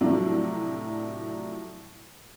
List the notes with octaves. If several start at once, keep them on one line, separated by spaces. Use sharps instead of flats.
A2 C3 F3 F#3 D4